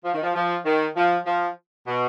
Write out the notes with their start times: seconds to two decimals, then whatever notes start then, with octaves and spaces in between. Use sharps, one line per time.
0.05 F3
0.14 D#3
0.23 F3
0.35 F3
0.65 D#3
0.96 F3
1.26 F3
1.87 B2